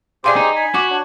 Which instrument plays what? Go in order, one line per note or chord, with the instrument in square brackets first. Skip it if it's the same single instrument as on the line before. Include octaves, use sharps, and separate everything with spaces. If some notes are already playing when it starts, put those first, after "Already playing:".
[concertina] G4 G#4 C5 [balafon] D5 F5 C6
[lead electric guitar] D#4
[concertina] G#5 B5
[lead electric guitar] F#4 [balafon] D6
[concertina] D4 C#5 F#5